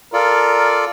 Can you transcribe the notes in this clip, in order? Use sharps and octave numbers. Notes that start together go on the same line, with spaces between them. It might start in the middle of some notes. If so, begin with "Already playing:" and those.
F4 A4 A#4 D5